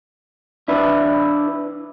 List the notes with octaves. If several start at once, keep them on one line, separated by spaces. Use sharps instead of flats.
D4 E4 B4